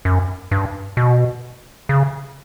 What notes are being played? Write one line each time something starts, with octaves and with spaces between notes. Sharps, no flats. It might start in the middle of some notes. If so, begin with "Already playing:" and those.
F#2
G2
B2
C#3